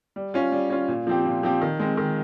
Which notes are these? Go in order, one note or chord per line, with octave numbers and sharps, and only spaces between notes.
G3
C#4 F4
G3
C#4 F4
A#2
F3 C4 G4
A#2
F3 C4 G4
D#3
G#3 C4
D#3